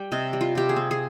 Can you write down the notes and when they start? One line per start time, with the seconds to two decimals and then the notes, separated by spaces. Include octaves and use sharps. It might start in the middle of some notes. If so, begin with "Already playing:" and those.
Already playing: G3 G5
0.12 C3 D#5
0.33 G3
0.41 F4
0.55 C3 G4
0.69 G#4
0.76 C4
0.91 G#4